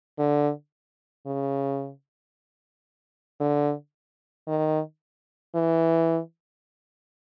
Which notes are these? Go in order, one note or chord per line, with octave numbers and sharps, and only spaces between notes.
D3
C#3
D3
D#3
E3